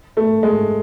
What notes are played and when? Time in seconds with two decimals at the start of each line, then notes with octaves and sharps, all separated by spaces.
0.17 A3
0.43 G#3